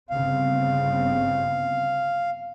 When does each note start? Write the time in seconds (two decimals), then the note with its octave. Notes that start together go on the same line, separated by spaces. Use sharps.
0.10 G1 C#3 C4 F5